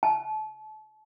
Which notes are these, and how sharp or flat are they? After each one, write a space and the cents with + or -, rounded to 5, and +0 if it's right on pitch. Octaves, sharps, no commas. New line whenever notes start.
A5 -35